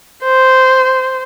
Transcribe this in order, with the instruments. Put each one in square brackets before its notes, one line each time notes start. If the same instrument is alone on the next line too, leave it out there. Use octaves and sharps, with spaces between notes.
[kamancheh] C5